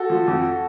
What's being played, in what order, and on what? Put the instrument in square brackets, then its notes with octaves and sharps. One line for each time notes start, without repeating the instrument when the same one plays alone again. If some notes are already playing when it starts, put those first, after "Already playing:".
Already playing: [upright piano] F#4 A4
F3
F2